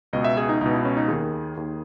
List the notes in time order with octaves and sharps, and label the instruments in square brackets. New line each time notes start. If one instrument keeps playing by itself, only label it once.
[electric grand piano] C#2 B2 D#5
E5
G#4
D#4
C#2 B2 D#4
E4
C#4
D#4
D#2 D#3 G#4
D#2 D#3